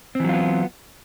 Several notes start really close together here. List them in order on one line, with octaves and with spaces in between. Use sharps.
C4 E3 F#3 F4 B3